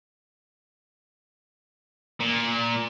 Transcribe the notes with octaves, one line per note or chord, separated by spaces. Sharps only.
A#2